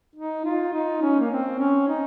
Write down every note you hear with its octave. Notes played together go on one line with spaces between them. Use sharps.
D#4
F4
D#4
C#4
A#3
C4
C#4
D#4